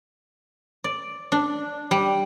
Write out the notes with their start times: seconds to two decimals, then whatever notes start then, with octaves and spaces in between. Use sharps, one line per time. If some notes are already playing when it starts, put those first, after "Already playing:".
0.84 D5
1.32 D4
1.91 G3